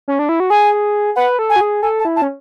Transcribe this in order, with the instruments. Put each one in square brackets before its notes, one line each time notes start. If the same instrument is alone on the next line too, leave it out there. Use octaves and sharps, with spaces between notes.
[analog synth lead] C#4
D4
E4
F#4
[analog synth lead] G#4 [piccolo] G#5
[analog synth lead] B4 [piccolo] F#5
[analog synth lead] A4
[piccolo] G#5
[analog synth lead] F#4
G#4
[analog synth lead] A4 [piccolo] G#5
[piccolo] A5
[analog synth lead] E4
[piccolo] A5
[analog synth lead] C#4